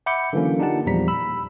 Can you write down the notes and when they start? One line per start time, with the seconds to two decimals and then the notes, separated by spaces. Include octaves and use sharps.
0.06 E5 F#5 B5 D6 G6 C#7
0.33 D3 E3 F#3 A#3 C#4
0.59 D4 D#4 F4 G4 F#5 A5
0.86 E2 A#2 F3 G3 A#5 B6
1.08 B5 E6